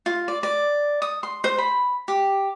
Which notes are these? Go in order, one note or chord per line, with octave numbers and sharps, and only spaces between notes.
F4
D5
D5
D#6
C6
C5
B5
G4